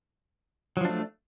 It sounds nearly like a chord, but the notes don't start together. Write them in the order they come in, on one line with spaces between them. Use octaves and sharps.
F#3 F3 D4 A3